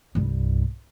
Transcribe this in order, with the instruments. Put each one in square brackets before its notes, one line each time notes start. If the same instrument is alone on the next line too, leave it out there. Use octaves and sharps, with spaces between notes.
[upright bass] C2 G2